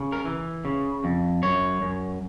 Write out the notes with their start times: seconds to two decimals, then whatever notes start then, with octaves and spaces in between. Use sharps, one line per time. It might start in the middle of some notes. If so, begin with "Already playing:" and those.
Already playing: C#3
0.12 A#4
0.25 E3
0.65 C#3
1.04 F2
1.43 F#2 C#5
1.82 F#2